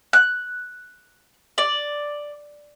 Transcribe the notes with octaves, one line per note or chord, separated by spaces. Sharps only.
F#6
D5